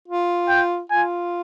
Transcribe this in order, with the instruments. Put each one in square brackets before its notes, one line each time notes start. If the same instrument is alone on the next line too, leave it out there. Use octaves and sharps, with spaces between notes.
[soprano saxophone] F4
[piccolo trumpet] G5
[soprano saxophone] F4 [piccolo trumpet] G#5